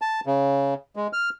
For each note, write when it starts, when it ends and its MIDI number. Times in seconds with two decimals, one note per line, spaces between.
0.02 0.20 81
0.26 0.74 49
0.96 1.07 56
1.13 1.30 89